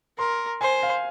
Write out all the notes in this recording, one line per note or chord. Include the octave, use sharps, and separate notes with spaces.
A#4 C6
C5 G#5
F5